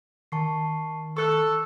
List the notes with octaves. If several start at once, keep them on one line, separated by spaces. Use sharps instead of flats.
D#3 A5 C#6 C7
A4 C#6 F#6